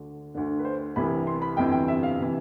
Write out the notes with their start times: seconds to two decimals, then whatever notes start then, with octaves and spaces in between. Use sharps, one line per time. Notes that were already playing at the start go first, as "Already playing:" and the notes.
Already playing: D2 D3
0.34 D2 D3
0.59 B4
0.65 C5
0.96 C2 C3 E3 B5
1.27 C6
1.42 B5
1.57 G1 F2 C3 E3 G5
1.72 G5
1.88 E5
2.03 F5
2.21 C3 E3